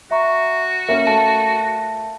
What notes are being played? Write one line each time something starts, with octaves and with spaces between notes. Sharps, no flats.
F#4 E5 A#5 C#6
A#3 C#4 A#4 E5 F5
A3 A5